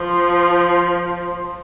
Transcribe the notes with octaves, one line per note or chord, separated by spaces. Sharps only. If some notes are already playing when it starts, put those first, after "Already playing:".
Already playing: F3